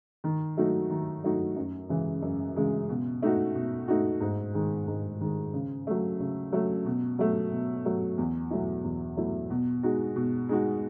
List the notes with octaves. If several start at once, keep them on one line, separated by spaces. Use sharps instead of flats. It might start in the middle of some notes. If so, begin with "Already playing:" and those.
D#3
F#3 A3 D#4 F#4
D#3
F#3 A3 D#4 F#4
F#2
C#3 E3 G#3
F#2
C#3 E3 G#3
B2
A3 D#4 F#4
B2
A3 D#4 F#4
G#2
D#3 G#3
G#2
D#3 G#3
C#3
F#3 A3
C#3
F#3 A3
B2
F#3 A3
B2
F#3 A3
E2
B2 F#3 A3 E4
E2
B2 F#3 A3 E4
B2
G#3 D#4 F#4
B2
G#3 D#4 F#4